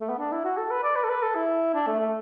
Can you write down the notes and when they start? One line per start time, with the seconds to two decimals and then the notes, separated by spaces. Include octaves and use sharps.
0.01 A3
0.09 B3
0.19 D4
0.32 E4
0.44 F#4
0.58 A4
0.70 B4
0.83 D5
0.96 B4
1.04 A4
1.09 B4
1.22 A4
1.35 E4
1.74 D4
1.87 A3
1.99 A3